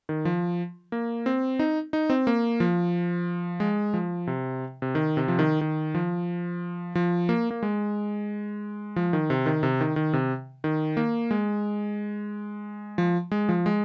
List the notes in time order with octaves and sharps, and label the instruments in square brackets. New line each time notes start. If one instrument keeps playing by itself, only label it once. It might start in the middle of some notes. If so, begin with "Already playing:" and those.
[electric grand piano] D#3
F3
A#3
C4
D#4
D#4
C4
A#3
F3
G#3
F3
C3
C3
D#3
C3
F3
D#3
D#3
F3
F3
A#3
A#3
G#3
F3
D#3
C3
D#3
C3
D#3
D#3
C3
D#3
A#3
G#3
F3
G#3
F3
G#3